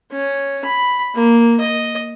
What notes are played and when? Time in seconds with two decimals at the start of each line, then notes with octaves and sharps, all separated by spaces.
0.12 C#4
0.65 B5
1.15 A#3
1.60 D#5